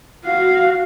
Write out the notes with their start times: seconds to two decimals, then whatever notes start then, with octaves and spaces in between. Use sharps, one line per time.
0.25 F#4 F5